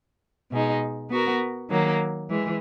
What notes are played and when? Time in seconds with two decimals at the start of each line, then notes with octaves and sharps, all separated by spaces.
0.51 B2 G#3 D#4
1.10 B3 F#4 A#4
1.70 D#3 F#3 A#3
2.29 E3 G#3